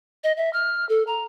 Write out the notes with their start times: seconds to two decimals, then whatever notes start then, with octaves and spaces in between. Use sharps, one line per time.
0.24 D#5
0.37 E5
0.53 F6
0.89 A4
1.07 A#5